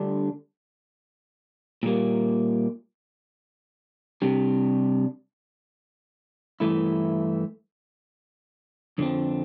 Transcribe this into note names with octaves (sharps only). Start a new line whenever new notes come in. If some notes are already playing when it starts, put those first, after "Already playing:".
Already playing: D2 D3 G3 D4
A#2 G3 A#3
C3 G3 D4
G2 E3 A3 E4
F2 D3 F3 C4